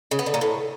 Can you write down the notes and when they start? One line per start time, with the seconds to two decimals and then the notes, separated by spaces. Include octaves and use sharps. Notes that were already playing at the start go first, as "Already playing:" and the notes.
0.11 C#3
0.19 B3
0.26 D3
0.34 A#2
0.41 A2